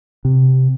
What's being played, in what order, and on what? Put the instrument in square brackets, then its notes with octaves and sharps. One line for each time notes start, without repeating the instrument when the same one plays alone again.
[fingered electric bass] C3